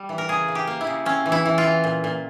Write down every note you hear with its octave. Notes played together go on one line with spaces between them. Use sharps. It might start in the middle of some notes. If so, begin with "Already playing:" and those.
Already playing: G3
E3
A#4
C#3 G#4
C#3
G4
A#3
E4
C#3
C4 C#4
E3
E4
E3
F4
E3
A#2
A#2